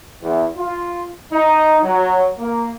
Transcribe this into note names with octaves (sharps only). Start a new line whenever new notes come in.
E2
F4
D#4
F#3
A#3